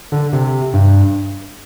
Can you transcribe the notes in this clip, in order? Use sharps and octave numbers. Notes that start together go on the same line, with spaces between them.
D3
C3
G2